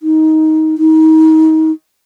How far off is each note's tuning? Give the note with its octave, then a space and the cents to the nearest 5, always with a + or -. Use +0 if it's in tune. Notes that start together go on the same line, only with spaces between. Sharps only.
D#4 +15
D#4 +30